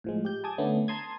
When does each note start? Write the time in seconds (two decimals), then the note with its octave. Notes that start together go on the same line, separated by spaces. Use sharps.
0.04 A2 F3 G#3
0.25 G4 G6
0.44 G#5 A5 D6 D#6 G#6
0.58 D3 A3 B3 C#4
0.88 A5 A#5 C6 D#6 G#6